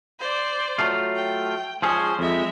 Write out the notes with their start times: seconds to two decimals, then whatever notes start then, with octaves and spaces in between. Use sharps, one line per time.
0.19 C5 D5
0.78 F#3 A3 F4
1.16 G5
1.82 F3 G#3 C#4 G#4 C5
2.19 F2 G#3 E5